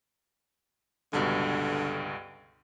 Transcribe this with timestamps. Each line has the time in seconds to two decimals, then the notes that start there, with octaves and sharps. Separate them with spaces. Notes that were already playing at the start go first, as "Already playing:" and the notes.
1.13 C#2 G2 B2 D3